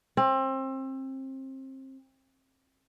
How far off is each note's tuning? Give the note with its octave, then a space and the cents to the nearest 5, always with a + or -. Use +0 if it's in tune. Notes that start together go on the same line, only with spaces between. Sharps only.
C4 +30